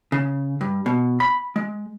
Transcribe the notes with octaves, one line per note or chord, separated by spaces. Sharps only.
C#3
G2
B2
B5
G#3